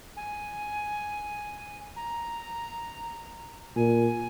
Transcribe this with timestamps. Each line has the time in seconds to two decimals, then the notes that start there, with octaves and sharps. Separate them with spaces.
0.16 G#5
1.96 A#5
3.76 A#2 G#5